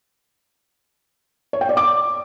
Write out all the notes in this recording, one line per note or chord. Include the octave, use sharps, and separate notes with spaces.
C#5
G5
D5
D6